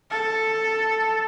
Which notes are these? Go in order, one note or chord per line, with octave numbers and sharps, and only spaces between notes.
A4